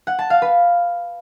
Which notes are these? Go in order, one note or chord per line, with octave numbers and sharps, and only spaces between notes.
F#5
A5
F5
B4